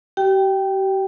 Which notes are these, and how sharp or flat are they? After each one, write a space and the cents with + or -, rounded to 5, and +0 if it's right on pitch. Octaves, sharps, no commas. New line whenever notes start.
G4 -40 G5 +0